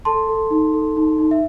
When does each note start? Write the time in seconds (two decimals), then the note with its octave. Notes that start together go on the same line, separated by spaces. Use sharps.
0.05 A4 A5 C6
0.29 A4
0.50 D#4
0.74 A4
0.96 D#4
1.18 D#4
1.31 E5